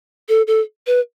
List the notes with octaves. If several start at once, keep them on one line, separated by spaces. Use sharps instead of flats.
A4
A4
B4